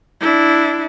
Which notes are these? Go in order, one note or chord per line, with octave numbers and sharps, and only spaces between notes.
D4 E4